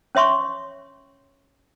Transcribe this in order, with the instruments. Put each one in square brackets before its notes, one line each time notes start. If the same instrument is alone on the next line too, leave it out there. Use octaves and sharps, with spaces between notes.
[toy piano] C#4 C#5 E5 C6 C#6